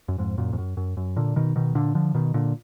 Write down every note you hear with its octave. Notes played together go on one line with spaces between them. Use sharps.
F#2
F2 G#2
F#2 A#2
F2
F#2
F#2
F#2
A#2 D3
B2 D#3
B2 D#3
A#2 D3
D3 F3
B2 D#3
A#2 D3